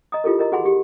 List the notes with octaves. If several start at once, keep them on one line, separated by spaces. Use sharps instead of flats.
D#5 A#5 D#6
E4 F4 G4 A4 A#4
A#4 D#5 A#5
F#4 G#4 F#5 G#5 B5 C6
G4